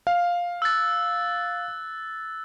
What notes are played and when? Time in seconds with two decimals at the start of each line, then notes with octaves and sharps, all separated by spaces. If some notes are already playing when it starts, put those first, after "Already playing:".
0.07 F5
0.62 E6 F#6 A6